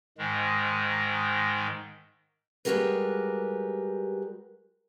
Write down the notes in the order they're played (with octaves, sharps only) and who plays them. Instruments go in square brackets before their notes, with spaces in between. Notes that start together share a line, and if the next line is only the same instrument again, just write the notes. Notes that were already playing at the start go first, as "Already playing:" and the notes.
[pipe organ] G#2 D#3 G#3
[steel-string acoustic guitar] G3 G#3 F#4 G4 A#4 B4